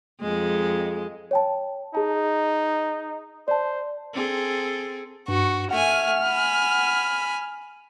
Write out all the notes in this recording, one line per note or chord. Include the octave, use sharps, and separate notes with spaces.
F2 G#3
C#5 G5 A5
D#4 G#4 A5
C5 D5 A5
C4 G#4 A4
G2 F#4 C#6
A3 F#5 G#5 F6
G#5 B5